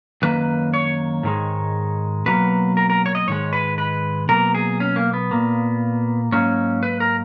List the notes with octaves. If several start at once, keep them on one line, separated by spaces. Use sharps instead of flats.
F#2 D#3 F#3 A#3 B4
C#5
G#2 D#3 G#3
B2 F#3 A#3 B4
A#4
A#4
C#5
D#5
G#2 D#3 G#3 C#5
B4
B4
B2 F#3 A#3 A#4
G#4
C#4
A#3
B3
A#2 A#3
G#2 F#3 A#3 C#4
B4
A#4